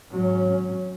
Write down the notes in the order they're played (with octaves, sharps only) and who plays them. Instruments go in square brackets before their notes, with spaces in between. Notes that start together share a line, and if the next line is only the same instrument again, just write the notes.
[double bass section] G#1 C#4 [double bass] F#3